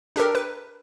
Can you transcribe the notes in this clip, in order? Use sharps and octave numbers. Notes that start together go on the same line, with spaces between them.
D4 G4 A4 A#4
B4